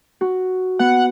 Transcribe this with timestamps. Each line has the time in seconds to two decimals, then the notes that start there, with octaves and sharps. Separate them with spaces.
0.21 F#4
0.79 B3 F#5